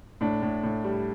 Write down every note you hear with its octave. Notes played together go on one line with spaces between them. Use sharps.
A2 D4
A2
A2
G3